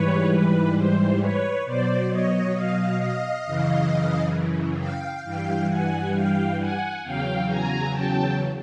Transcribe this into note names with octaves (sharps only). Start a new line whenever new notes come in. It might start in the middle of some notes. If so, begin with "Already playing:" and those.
Already playing: G#2 E3 G3 B4 C#5
B4
C5
B4 C#5
B2 F#3 C5 D5
C#5 D#5
D#5 F5
D#5 F5
F#2 C#3 E3
F5 G5
G2 E3 G3 F5 G5
F#5 G#5
F5 G5
F#5 G#5
E2 C#3 F#3 F5 G5
G#5 A#5
G5 A5